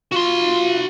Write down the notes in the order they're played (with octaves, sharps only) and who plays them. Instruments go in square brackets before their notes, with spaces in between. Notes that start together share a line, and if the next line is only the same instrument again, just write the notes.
[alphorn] F4 [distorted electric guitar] F#4 C6